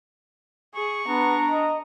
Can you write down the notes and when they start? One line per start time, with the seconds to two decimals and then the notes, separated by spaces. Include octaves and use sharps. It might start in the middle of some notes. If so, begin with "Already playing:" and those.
0.75 G#4 C#6
1.08 B3 D4 A#5
1.51 D#5